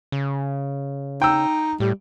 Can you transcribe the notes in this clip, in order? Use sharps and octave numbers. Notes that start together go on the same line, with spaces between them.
C#3
D#4 G5 E6
A2 G3